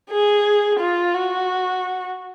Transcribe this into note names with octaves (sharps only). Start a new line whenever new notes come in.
G#4
F4
F#4